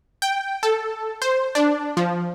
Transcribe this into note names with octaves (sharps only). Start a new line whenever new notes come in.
G5
A4
C5
D4
F3